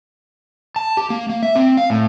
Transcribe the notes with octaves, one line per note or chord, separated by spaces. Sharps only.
A5
G4
A#3
A#3
E5
C4
F5
A2